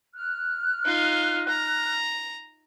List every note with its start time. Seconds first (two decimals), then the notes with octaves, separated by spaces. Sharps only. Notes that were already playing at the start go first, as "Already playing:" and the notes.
0.14 F6 F#6
0.85 D#4 F4
1.49 A#5